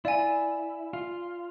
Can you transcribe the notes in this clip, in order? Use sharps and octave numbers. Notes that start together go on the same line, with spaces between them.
E4 D5 F5 G#5
F4